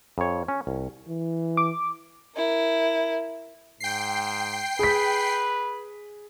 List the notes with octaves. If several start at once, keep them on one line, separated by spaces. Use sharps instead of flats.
F2 C#5
C#4
C2
E3
D6
E4 A#4
G#2 G5 C7
G#4 B4 B6